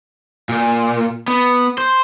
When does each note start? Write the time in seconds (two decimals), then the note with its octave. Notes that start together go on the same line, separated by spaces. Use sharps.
0.49 A#2
1.28 B3
1.78 C5